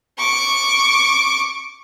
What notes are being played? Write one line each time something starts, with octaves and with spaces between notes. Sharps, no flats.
C#6 D6